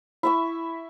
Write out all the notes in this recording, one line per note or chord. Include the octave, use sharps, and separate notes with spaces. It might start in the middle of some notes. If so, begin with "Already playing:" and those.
E4 E5 C#6